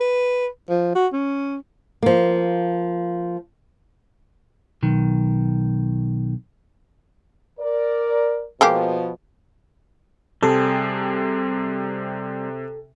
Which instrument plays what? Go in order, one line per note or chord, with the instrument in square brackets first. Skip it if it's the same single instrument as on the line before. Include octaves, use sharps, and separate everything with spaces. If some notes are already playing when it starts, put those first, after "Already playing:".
[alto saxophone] B4
F3
F#4
C#4
[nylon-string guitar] F3 A#3
[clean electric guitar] B1 D#3
[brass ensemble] A#4 D5
[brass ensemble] B2 F3 [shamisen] G#3 A#3 G4
[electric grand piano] C3 [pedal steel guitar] G3 C4 G#4 [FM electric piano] A4